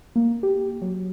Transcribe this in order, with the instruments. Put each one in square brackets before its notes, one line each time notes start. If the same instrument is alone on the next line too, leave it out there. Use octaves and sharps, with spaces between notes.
[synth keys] A#3
G4
F#3